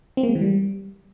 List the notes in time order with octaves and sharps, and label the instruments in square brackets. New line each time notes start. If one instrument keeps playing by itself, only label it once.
[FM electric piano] C4
A#3
G#3
E3
G3